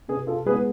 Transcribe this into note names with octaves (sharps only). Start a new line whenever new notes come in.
C3 G#4 B4
F4 A4
G#3 B3 G#4 B4